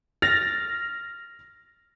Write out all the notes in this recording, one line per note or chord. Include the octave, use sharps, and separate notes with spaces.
F6 A6 A#6 F7